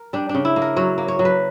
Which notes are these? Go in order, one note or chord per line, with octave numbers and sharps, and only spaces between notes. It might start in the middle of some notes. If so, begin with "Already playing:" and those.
Already playing: A#4
G3 D4
D4
C#3
E4
A#3
A#4
F#3 C#5
A#3
C#5
F#3
B4